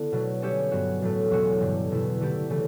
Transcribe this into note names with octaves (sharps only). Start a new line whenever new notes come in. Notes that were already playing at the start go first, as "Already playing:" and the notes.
Already playing: D3 B3 E4
B2 F#3 A3
G3 C#4 G4 C#5 E5
G2 F#3 B3 F#4
A2 F#3 A3
E2 B2 F#3 C#4 F#4
G2 D3 G3
E2 B2 A3 E4
D3 A3 E4 G4
C#3 E3 A3